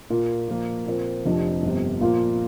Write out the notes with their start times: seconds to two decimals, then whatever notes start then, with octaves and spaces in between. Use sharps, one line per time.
0.10 A#2 A#3 F4 A#4
0.48 A#2 F3 A#3
0.87 A#2 F3 C4 A#4
1.25 F1 F2 C3 F3 D4
1.63 G1 F2 C3
2.01 A#2 F3 A#3 F4